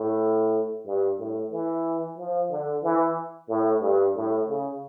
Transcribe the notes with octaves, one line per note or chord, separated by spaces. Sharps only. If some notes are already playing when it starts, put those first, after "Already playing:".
Already playing: A2
G2
A2
E3
F3
D3
E3
A2
G2
A2
C#3